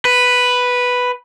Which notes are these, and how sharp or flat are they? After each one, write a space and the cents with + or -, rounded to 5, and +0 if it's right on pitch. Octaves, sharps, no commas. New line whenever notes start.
B4 +0